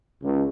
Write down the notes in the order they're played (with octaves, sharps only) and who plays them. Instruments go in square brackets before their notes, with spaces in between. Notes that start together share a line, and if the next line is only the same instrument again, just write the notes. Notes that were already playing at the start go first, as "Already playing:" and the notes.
[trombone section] C#2